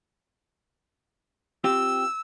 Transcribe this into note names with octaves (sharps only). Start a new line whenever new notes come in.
C4 F4 G4 E6